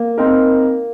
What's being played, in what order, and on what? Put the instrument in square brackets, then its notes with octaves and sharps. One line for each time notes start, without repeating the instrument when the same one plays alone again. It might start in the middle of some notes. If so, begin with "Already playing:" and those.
Already playing: [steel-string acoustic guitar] A#3
[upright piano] C4 D#4 A#4